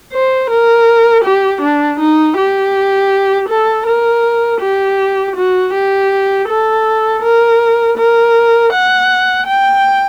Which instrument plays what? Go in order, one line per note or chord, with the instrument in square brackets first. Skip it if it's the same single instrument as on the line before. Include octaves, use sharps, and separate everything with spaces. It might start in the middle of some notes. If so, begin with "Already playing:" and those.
[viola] C5
A#4
G4
D4
D#4
G4
A4
A#4
G4
F#4
G4
A4
A#4
A#4
F#5
G5